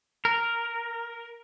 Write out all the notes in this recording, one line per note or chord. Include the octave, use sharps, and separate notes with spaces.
A#4